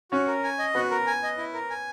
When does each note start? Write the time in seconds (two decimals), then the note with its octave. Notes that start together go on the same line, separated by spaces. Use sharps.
0.12 C#4 F#4 C#5
0.28 A#4
0.44 G#5
0.59 D#5
0.75 B3 F#4 B4
0.91 A#4
1.07 G#5
1.23 D#5
1.38 E4
1.54 A#4
1.70 G#5